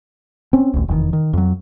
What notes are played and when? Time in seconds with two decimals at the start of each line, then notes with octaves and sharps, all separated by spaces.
0.53 C4 C#4
0.74 A1 D2
0.88 F1 E2 A2 D#3
1.13 D#3
1.33 F2 F#3